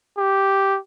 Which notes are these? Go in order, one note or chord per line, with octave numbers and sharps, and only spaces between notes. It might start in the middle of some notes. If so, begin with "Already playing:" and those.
G4